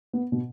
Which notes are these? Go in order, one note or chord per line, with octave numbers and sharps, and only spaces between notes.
B3
B2